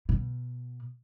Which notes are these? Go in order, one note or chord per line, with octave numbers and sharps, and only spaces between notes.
B2